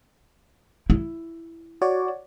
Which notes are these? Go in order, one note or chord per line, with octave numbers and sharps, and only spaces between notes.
E4
F#4 C#5 D5